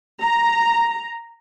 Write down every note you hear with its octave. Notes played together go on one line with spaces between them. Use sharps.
A#5